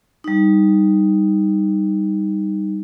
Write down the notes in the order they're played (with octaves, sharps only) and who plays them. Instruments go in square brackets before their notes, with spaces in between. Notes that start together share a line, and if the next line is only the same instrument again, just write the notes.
[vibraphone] G3 D#4